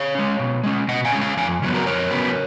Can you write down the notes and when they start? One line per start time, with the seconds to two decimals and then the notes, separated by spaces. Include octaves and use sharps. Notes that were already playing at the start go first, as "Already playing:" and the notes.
Already playing: C#5 F5
0.15 G#3 C#4
0.40 B2
0.64 G#3 C#4
0.88 B2 D#5 F#5
1.05 F5 G#5
1.12 G#3 C#4
1.21 F5 G#5
1.37 F2 F5 G#5
1.62 C#3 F#3 B3
1.74 F#4 A#4
1.86 F2 A#4 C#5
2.11 C#3 F#3 B3